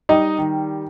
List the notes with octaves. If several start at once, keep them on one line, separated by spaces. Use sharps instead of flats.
G3 D#4 D#5
D#3